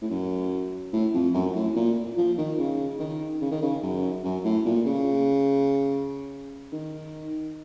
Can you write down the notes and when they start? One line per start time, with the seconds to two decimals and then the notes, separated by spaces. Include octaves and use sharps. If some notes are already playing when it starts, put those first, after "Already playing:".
0.02 A2
0.10 F#2
0.93 A2
1.14 F2
1.34 F#2
1.55 A2
1.76 A#2
2.17 F3
2.38 D#3
2.58 C#3
3.00 D#3
3.41 C#3
3.51 D#3
3.62 C#3
3.83 F#2
4.24 F#2
4.44 A2
4.65 A#2
4.86 C#3
6.72 D#3